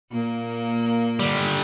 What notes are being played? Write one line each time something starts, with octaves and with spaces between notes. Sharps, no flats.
A#2 A#3
D3 G3